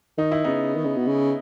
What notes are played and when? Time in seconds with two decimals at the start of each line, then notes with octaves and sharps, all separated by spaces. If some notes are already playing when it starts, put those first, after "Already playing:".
0.18 D#3 D#4
0.32 E4
0.44 C#3 B3 D#4
0.75 D#3
0.85 C#3
0.96 B2
1.07 C#3